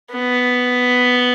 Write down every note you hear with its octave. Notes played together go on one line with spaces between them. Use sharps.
B3